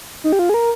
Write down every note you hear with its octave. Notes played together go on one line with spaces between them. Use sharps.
D#4
G4
F4
G#4
A#4